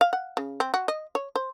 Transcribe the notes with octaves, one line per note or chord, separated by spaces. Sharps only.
F5
F#5
C#3
C4
F#4
D#5
C#5
C5